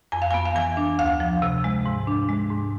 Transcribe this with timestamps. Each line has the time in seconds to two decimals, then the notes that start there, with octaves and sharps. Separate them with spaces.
0.12 F2 G#5
0.22 F5
0.31 B3 G#5
0.45 F5
0.56 E3 G#5
0.77 D4
0.99 D2 F5
1.20 F3
1.42 C3
1.64 G#3
1.86 G#2
2.07 D4
2.29 G#3
2.50 G#2